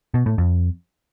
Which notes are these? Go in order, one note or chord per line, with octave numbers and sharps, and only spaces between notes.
B2
A2
F2